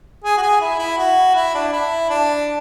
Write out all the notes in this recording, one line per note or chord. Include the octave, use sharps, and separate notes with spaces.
G#4
F#4
G#4
E4
E4
F#4
E4
D4
E4
D4